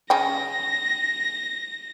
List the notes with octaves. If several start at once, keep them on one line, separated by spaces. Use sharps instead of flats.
C#3 C#4 G5 A#6